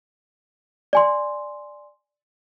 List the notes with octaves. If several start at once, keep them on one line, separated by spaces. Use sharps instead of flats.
D5 G#5 C6